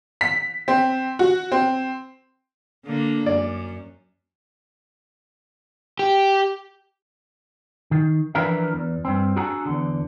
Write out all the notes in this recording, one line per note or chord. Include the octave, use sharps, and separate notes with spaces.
B6
C4
F#4
C4
D3 A#3
F#2 D5
G4
D#3
E3 F3 D4 A#4 B4 E5
E2
G2 C4
D4 F#4 G#4 A4 F#5 A#5
E2 D3